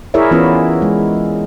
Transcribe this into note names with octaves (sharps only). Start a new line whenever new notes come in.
E4 G#4 A#4 C#5 D5 E5
E3 B3 C#4 E4 F4
G#3